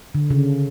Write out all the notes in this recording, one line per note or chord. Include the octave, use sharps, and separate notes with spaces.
D3
C#3